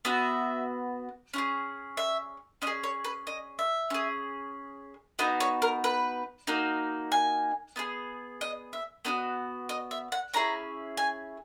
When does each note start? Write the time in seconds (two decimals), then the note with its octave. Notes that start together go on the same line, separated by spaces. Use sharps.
0.05 B3 F#4 E5
1.34 C#4 E4 G#4
1.97 E5
2.62 C#4 D#5
2.67 G#4
2.83 C#5
3.04 B4
3.27 D#5
3.59 E5
3.90 C#4 G#4
5.19 B3 D#4 F#4 D#5
5.40 C#5
5.62 A#4
5.84 B4
6.47 A#3 D#4 F#4
7.12 G#5
7.76 B3 D#4 G#4
8.41 D#5
8.73 E5
9.05 B3 D#4 F#4 D#5
9.69 D#5
9.91 E5
10.12 F#5
10.34 C#4 E4 G#4 A#5
10.97 G#5